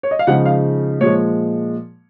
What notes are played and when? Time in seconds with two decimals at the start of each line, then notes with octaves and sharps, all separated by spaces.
0.03 C#5
0.11 D#5
0.19 F5
0.27 C#3 F3 G#3 D#4 F#5
0.46 F5
1.01 A#2 F3 G#3 C#5